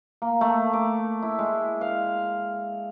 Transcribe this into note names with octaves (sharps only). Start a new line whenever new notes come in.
A#3
A3
D6
E4
G#3
F5